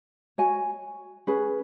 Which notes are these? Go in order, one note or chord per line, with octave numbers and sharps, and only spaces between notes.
F#4 C#5 G#5
C#4 G#4 B4